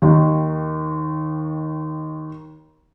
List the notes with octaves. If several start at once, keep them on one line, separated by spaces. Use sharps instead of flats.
D#2 D#3